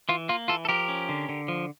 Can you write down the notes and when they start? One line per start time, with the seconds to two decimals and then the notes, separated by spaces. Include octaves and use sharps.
0.09 E3 F4
0.29 A#3 F4
0.48 E3 F4 A4
0.65 A4
0.69 F3 G4 A#4
0.88 C#4
1.09 D3
1.29 D3
1.48 F3